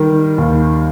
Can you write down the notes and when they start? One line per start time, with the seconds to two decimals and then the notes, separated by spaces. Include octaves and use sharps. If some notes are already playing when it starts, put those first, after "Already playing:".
Already playing: D#3 G3
0.38 D#2